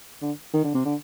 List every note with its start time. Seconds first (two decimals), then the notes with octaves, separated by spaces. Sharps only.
0.22 D3
0.53 D#3
0.64 D3
0.74 C3
0.85 D3